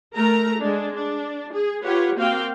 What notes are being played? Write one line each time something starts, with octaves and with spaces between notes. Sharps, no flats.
A3 A#4 A#5
G#3 D4
D4
G#4
F4 G4 B4 C#5 F#5
A#3 C4 F#4 F5 G5